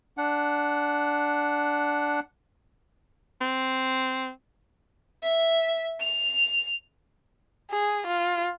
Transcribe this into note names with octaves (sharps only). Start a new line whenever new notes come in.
D4 F#5
C4
E5
F7
G#4
F4